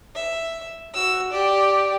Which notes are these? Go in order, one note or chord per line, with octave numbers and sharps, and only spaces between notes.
E5
F#4 E6
G4 D5